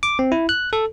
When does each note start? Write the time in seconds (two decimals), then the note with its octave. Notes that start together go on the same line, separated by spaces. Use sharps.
0.03 D6
0.19 C4
0.32 E4
0.49 F#6
0.73 A4